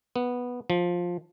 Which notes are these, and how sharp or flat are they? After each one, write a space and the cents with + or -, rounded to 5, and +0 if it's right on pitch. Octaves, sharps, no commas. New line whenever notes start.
B3 -5
F3 +10